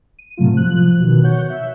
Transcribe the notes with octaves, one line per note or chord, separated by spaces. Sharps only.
D#7
A2 C3 F#3 A3 F4
F3 F#6
B2 D#3
C#5 F#5 G6
E5